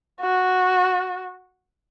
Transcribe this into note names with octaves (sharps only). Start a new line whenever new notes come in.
F#4